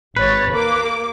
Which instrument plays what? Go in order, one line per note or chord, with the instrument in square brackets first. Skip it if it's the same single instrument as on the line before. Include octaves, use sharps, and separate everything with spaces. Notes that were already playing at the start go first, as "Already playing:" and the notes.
[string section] G#1 C#5 A6 [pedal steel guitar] B4
[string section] D#2 A#3 D6